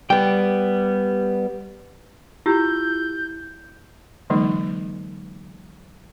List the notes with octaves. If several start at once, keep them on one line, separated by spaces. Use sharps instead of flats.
G3 B3 G5
E4 F4 G4 E6 G6
D3 E3 F#3 G#3 A#3 D#4